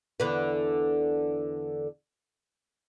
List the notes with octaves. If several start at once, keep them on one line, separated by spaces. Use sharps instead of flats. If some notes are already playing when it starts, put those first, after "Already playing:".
E2 D3 B4